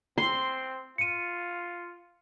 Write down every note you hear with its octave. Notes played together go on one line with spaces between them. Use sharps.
C4 C6
F4 C#7 D#7